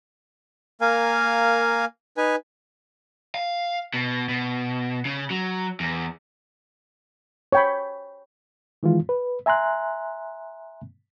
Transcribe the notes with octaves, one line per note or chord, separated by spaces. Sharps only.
A#3 A#4 F5 G#5
D#4 B4 G#5
F5
B2
B2
C#3
F#3
E2
C#5 G5 B5
D#3 E3 G#3 F4
B4
E5 G#5 A#5 C6 F#6